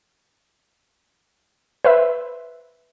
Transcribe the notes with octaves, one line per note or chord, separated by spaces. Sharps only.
B4 C5 E5